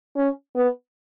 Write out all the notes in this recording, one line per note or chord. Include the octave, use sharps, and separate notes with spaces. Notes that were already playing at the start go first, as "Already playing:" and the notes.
C#4
B3